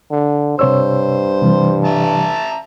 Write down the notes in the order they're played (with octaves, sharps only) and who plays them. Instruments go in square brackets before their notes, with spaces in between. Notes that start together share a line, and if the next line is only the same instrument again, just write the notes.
[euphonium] D3
[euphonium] G2 [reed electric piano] C3 C#5 E6 [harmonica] C5
[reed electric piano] C3 E3 G3
[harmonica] E5 A5 A#5